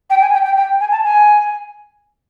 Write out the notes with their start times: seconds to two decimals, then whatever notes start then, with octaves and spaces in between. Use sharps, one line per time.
0.10 G5
0.21 G#5
0.33 G5
0.45 G5
0.57 G5
0.80 G#5
0.92 A5
1.04 G#5